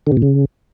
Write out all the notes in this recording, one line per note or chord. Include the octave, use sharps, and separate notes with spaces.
D3
C3
A#2
C#3